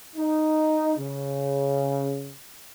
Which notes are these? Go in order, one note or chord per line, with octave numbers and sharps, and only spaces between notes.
D#4
C#3